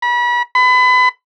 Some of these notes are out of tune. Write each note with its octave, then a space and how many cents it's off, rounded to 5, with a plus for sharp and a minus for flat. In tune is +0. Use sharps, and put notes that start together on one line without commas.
B5 -35
B5 +30